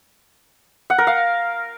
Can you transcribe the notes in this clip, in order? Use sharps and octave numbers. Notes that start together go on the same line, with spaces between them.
F#5
A#4
F5